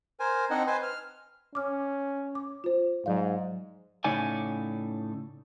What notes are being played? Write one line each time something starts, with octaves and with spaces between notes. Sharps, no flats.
A#4 C5 G#5
C4 D4 D#4 D#5 F#5
B4 C5 G#5 C6
F6
C#4 D6 F6
D6
F4 C5
G#2 F#3 D5 F5
A2 C#3 D#4 C#5 D5 G#5